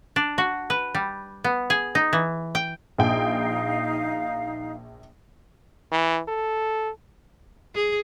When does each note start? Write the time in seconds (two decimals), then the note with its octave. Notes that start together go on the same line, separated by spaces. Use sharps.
0.16 D4
0.38 F#4
0.70 B4
0.95 G3
1.44 B3
1.70 G#4
1.95 D#4
2.13 E3
2.55 G5
2.98 A#1 D#4 F5 G5
5.92 E3
6.28 A4
7.75 G#4